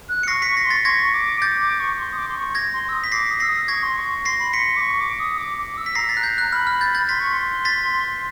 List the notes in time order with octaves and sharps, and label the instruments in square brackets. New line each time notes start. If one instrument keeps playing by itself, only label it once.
[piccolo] F#6
[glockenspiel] C#7
[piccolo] C#6 [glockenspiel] A#6 C7
[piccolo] C#6 [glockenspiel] B6 C#7
[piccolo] C#6 [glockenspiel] A#6 C7
[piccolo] C6
[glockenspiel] A6 B6
[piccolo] C#6 [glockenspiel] G#6 A#6
[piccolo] D6
[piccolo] D6 [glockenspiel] G6 A6
[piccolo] D6
C#6
C6
D#6
D6
C6
C#6
[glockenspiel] G#6 A#6
[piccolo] C6
E6
D#6
[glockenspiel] B6
[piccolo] D6 [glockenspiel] A#6 C7
[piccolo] D#6
[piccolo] E6 [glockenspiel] A#6 C7
[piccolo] D#6
[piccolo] C#6 [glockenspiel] G#6 A#6
[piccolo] C6
C#6
[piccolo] C6 [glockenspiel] A#6 C7
[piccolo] B5
[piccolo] C6 [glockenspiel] B6 C#7
[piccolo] D6
C#6
D6
D#6
D6
D6
E6
[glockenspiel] B6
[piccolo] A#5 [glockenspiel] A#6 C7
[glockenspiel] A6 B6
F#6
G6
F#6
[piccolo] B5 [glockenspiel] F6
[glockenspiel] F6
G6 A6
G6 A6
[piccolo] C6 [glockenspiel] A6 B6
[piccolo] C#6
C6
[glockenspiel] A6 B6